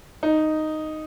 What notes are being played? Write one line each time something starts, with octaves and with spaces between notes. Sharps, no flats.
D#4